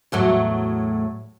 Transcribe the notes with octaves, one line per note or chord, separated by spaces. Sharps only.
E2 A2 F#3